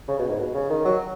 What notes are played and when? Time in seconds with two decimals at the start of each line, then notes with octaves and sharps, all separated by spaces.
0.08 C#3
0.19 B2
0.29 G#2
0.39 B2
0.55 C#3
0.70 D#3
0.85 F#3